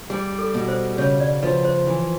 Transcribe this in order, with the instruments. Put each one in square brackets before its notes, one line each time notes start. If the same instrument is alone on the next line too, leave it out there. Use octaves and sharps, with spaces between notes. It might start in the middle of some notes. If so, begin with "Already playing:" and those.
[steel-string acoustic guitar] G3 [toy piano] G#4
[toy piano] A4
[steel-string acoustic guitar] B2
[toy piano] C5
[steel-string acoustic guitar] C#3 [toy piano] C#5
[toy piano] D5
[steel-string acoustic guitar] F3 [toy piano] B4
[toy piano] C5
[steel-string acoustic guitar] E3